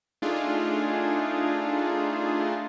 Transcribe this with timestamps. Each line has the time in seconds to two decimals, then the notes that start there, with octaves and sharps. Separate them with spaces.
0.22 A3 D4 D#4 F4 G#4